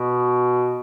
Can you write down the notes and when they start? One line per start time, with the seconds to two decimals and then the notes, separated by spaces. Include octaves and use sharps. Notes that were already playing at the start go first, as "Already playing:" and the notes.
Already playing: B2